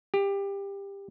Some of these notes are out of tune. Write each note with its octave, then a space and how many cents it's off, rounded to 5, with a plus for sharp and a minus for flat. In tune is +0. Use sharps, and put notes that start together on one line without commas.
G4 +20